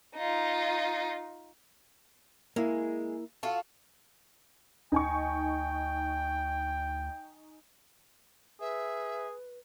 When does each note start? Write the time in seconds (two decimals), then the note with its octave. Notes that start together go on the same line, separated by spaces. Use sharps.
0.15 D#4 F4
2.56 G#3 A#3 E4
3.43 F4 F#4 A4
4.92 D2 D#4 G5 G#5 C#6
8.60 G#4 B4 E5